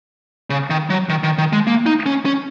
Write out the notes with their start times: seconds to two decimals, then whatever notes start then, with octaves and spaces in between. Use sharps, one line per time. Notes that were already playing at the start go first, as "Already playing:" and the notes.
0.50 C#3
0.70 D#3
0.90 F#3
1.09 D#3
1.24 D#3
1.38 D#3
1.53 G#3
1.67 A#3
1.86 D#4
2.06 C#4
2.25 C#4